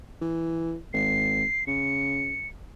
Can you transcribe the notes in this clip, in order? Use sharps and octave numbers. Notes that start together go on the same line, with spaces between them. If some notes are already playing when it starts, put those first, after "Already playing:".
E3
G#1 C7
C#3 C#7